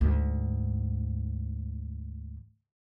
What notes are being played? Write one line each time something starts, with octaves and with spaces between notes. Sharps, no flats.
D2 G#2